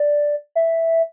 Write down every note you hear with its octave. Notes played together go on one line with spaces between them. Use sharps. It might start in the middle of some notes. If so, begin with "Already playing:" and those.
Already playing: D5
E5